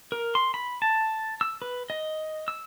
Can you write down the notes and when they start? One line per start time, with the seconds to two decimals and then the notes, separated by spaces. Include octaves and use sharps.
0.12 A#4
0.35 C6
0.54 B5
0.82 A5
1.41 E6
1.62 B4
1.90 D#5
2.48 E6